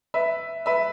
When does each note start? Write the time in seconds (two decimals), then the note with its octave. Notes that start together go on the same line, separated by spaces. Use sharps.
0.14 B4 E5
0.66 B4 E5